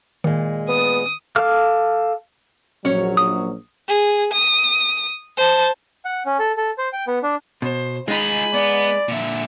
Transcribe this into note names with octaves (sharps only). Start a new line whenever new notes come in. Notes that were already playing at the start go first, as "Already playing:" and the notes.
A#2 D#3 G#3
B3 D#6
A4 F5 D6 F6
A#1 F#3 C#4 C#5
D#6
G#4
D#6
C5 A5
F#5
C#4
A4
A4
C5
G5
B3
D4
B2 C5
G#3 D#4 F4 G#4 G#5 B5
B3 D5
A#2 D3 E5